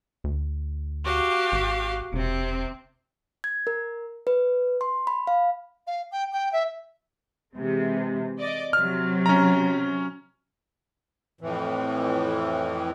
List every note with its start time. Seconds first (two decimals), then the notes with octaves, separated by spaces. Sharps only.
0.24 D2
1.04 F#4 G4 F5
1.52 G#1
2.13 E1 C3 C4
3.44 G#6
3.67 A#4
4.27 B4
4.81 C6
5.07 B5
5.27 F5
5.87 F5
6.11 G5
6.32 G5
6.52 E5
7.56 C3 E3 G#3
8.40 D5 D#5 D6
8.73 C3 F#3 F6
9.26 C#4 A#5
11.41 F2 A2 E3